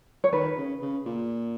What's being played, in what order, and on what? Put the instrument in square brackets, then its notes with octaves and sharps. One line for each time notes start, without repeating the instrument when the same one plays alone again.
[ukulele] C#5
[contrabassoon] D#3 [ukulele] B4
[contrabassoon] C#3
C#3
A#2